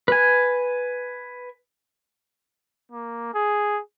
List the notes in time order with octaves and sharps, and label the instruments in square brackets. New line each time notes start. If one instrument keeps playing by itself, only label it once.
[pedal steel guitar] B4 G#5
[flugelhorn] A#3
G#4